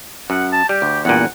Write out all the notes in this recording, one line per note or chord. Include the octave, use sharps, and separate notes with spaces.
F#2 F#5
A5
G3 G4
D2
E2 G2 A#2 F#5